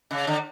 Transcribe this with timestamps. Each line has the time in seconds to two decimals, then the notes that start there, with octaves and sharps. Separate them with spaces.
0.11 C#3
0.27 D3